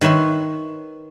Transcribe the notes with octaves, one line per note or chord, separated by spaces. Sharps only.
D#3 B4 C#5 E5 C6